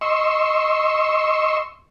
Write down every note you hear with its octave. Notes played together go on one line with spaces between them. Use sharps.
D#5 C6 C#6 E6